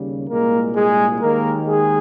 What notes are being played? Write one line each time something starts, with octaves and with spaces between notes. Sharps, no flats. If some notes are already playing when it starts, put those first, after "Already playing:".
Already playing: D#2 C#3 G3
C2 A#2 G#3 A#3 A#4
G#3 G#4
D#2 D#3 G#3 A#3 A#4
G#3 G#4